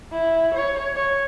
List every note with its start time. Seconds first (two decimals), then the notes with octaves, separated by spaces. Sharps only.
0.12 E4
0.54 C#5
0.96 C#5